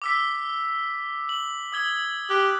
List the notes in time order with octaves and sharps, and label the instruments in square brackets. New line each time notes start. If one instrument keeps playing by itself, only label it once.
[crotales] D6 E6 B6
F#7
D#6 G#6 G7
[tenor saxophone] G4 [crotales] F#6